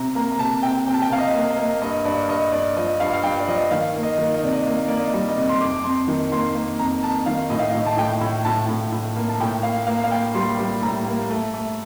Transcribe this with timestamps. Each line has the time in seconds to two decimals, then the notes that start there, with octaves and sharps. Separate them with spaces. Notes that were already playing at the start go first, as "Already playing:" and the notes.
Already playing: C3 A#5
0.15 A#3 A#5
0.32 A#5
0.39 C3 A5
0.63 C3 G5
0.86 C3 G5
0.94 A5
1.02 G5
1.10 C3 F5
1.18 D#5
1.35 A#3
1.51 D#5
1.57 A#3
1.82 G2 D#5
2.05 G2 D5
2.29 G2 D#5
2.52 G2 D5
2.77 F3 D#5
3.00 G2 F5
3.13 F5
3.23 G2 G5
3.40 D5
3.48 F3 D#5
3.71 D#3 F5
3.96 A#3
4.03 D#5
4.18 D#3
4.34 D#5
4.43 C3 D5
4.53 D#5
4.66 A#3
4.88 A#3 D5
4.98 D#5
5.13 G3
5.29 D#5
5.37 C3
5.49 C6
5.61 F2 D6
5.84 F2 C6
6.08 D#3
6.32 A#3 C6
6.55 A#3
6.79 F2 A#5
7.03 F2 A5
7.26 D#3 F5
7.50 A2 D#5
7.60 F5
7.70 A2 D#5
7.86 A5
7.97 A2 G5
8.21 A2
8.45 A2 A5
8.68 A2
8.92 A2
9.16 A#3
9.29 A5
9.40 A2 G5
9.63 A#3 F5
9.87 A#3 F5
10.04 F5
10.11 A#3 G5
10.34 G3 C6
10.58 G3
10.82 A2 A#5
11.07 A#3
11.30 A3
11.54 A3